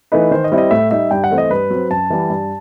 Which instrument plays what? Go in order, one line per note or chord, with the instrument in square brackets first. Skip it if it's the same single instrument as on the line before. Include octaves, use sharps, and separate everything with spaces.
[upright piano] E3 A3 D#4 [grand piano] B4
[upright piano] D#3 [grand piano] C5
[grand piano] D#5
[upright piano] G3 C4 E4
[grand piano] D#5
[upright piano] A2 [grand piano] E5
[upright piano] G3 D#4 [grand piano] E5
[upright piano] G2 [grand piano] G5
[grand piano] F#5
[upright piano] E3 A3 C4
[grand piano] D#5
[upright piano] G2 [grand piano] B4
[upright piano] F#3 C4
[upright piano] F#2 [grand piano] A5
[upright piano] E3 G3
G2